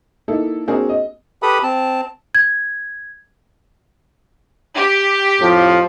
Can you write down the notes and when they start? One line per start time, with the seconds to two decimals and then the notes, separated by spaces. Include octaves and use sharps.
0.28 A#3 D#4 E4 A4
0.68 A#3 C4 D4 F#4 G#4 A#4
0.89 D#5
1.43 G4 A4 B4 B5 D#6
1.63 C4 A5
2.35 G#6
4.77 G4
5.41 F2 A2 F3